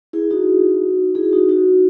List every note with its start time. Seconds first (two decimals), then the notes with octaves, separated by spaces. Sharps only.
0.13 E4 G#4
0.30 D#4 F#4
1.15 E4 G#4
1.32 D#4 F#4
1.49 D#4 F#4